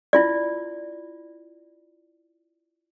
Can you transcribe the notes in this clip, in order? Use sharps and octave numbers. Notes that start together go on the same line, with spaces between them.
E4 F4 D5